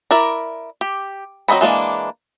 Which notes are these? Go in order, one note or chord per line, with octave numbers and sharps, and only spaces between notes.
E4 A#4 D5 A#5
G4
F#3 C4 D#5 A#5 B5
E3 G#3 A#3 D4